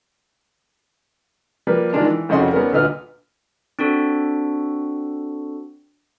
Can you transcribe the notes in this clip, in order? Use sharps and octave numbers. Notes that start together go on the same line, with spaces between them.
F3 G3 A#3 B4
D#3 G#3 D4 F4
E3
C2 F2 C#3 F#4 D#5 C6
G3 B3 C#4 A#4
D2 A#2 D3 B4 D#5 F6
C4 D4 F#4 A4